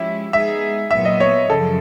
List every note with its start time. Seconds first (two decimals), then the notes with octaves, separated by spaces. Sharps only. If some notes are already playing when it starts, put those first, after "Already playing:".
Already playing: F3 G#3 C#4 E4 G4 E5
0.32 G#3 B3 D#4 G#4 E5
0.91 A#2 F#3 B3 E5
1.05 D#5
1.20 C#5
1.49 F#2 C#3 F3 A4